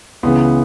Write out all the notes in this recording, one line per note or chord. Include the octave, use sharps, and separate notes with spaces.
C#2 C#3 E3 B3